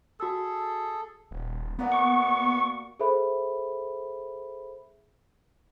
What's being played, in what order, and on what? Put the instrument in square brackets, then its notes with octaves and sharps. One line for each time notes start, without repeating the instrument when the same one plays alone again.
[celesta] F#4 E6 [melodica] G#4 A4
[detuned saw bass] D#1
[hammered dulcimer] A#3 F#4 D5 [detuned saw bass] B3
[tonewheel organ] C#6
[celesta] G#4 A4 C5 E5 B5